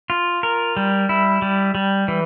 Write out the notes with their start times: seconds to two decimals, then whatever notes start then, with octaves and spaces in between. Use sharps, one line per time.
0.10 F4
0.43 A#4
0.77 G3
1.09 E4
1.42 G3
1.75 G3
2.08 E3